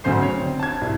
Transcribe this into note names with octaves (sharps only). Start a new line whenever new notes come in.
D2 C#3 F#3 C#4 C5 C7
C#5
D3 C4
A5 G#6
C2